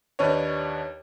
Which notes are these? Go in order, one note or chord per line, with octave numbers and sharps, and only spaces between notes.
D#2 D4 D#4 B4 C#5